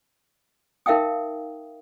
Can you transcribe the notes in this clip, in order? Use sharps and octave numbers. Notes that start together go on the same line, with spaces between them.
D#4 A#4 E5 F5 G5 D#6